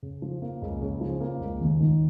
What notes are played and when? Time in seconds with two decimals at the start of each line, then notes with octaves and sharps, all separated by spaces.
0.03 C#3
0.22 F3
0.42 A#3
0.62 C#2
0.82 C#3
1.01 F3
1.21 A#3
1.41 C#2
1.61 D#2
1.80 D#3